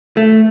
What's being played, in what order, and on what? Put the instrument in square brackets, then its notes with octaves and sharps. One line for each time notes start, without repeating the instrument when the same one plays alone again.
[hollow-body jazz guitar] A3